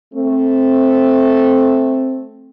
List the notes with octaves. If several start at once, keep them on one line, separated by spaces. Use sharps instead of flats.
A3 C4